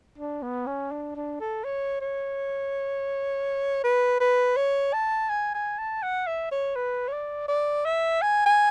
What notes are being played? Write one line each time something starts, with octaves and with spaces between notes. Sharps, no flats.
D4
B3
C#4
D4
D4
A4
C#5
C#5
B4
B4
C#5
A5
G#5
G#5
A5
F#5
E5
C#5
B4
C#5
D5
D5
E5
G#5
G#5